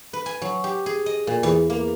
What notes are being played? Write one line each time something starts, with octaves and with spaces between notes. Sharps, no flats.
B4
G#5
F#3
G4
G#4
D#5
A#2
E2
A#3